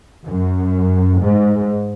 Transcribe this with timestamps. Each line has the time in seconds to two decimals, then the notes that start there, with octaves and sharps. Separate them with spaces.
0.25 F#2
1.19 G#2